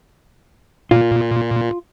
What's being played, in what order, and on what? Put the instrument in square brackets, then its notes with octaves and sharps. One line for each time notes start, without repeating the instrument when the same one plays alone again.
[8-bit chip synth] A#2 [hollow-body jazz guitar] F4